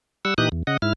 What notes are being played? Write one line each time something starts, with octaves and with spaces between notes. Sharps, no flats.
G3 F#5 E6
A#2 E3 D#4 G4 D#6 F#6
E2
C#3 D#5 F#5
G#2 E4 F6